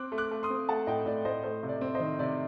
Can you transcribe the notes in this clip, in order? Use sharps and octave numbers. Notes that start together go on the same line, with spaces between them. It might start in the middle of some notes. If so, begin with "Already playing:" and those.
Already playing: C4 D6 F#6
A3
D6 F#6
A3
C6 D#6
C4
A3 F#5 A5
A2 D#5 G5
A2 D5
A2 C5 D#5
A3 C5 D#5
C3
D5
C4
C5 D#5
D#3
C3 D5